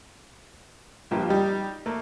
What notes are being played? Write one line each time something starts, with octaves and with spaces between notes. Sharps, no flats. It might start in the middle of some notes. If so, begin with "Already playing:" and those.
A#1 G2 F3 A#3 G4
G3 D#4 G4
A3 A#3